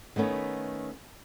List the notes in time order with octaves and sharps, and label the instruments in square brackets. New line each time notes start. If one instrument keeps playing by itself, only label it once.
[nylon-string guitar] D#3 A3 B3 C#4